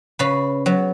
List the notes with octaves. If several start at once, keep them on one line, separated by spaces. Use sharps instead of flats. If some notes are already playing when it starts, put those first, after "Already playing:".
C#3 B4
F#3 B3